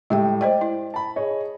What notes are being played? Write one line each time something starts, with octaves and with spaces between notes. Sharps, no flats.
A2 G3 G#3 G4 E5 G5
C5 D5 D#5 G5
E4
A5 B5
G#4 C#5 D#5